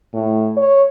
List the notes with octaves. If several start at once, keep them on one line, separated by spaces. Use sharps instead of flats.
A2
C#5